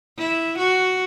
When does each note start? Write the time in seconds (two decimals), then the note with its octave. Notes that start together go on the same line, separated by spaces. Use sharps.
0.18 E4
0.58 F#4